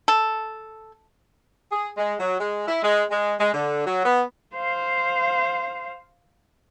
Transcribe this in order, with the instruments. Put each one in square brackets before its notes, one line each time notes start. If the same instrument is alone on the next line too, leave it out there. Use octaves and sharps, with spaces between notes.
[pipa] A4
[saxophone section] G#4
G#3
F#3
G#3
E4
G#3
G#3
G#3
D3
F#3
B3
[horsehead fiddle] C5 F5